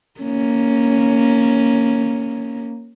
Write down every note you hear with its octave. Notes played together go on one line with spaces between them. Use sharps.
A#3 C#4